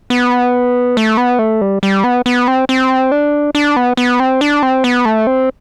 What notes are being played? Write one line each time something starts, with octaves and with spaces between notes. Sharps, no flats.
B3
A3
B3
A3
G3
G3
B3
B3
C4
C4
D4
D4
B3
B3
C4
D4
C4
B3
A3
C4